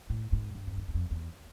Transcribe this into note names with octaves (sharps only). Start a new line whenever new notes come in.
A2
G#2
G2
F2
E2
E2
F2
E2